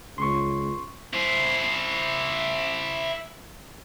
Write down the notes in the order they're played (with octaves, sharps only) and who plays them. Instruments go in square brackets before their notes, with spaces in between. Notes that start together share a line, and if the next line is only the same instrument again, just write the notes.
[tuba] C#2 [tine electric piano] C6 C#6
[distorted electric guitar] E4 C5